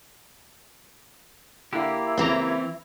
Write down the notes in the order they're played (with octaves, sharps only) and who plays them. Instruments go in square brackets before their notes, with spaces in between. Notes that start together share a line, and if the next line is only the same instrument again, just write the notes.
[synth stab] D3 [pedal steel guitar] A#3 G4 [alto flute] E4
[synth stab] C#2 A#5 [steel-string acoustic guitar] E3 C4